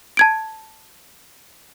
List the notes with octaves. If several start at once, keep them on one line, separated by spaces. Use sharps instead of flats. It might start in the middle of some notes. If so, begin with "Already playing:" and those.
A5 G#6 D7